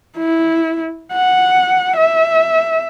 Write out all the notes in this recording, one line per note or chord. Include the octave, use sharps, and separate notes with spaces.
E4
F#5
E5